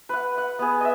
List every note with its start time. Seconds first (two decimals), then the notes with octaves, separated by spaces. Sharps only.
0.09 B4 F#5
0.38 F#5
0.59 B3 G#4
0.81 D#5 E5